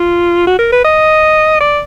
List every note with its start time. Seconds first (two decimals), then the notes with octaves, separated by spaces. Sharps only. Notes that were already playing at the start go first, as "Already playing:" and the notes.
Already playing: F4
0.47 F#4
0.59 A#4
0.72 B4
0.85 D#5
1.61 D5